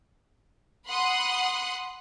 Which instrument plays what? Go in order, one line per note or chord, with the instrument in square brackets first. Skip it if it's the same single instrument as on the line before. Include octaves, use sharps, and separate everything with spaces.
[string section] F#5 B5 C6 D#6 F#6